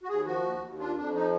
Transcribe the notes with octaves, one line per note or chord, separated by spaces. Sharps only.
F#4
D#2 G#4
F3 F#4
D#2
D#2
D4 F4
F2 D4
F3 D#4